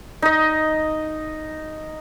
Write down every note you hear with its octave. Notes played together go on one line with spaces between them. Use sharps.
D#4 D#5